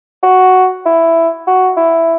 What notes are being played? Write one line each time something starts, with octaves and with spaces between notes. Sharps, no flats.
F#4
E4
F#4
E4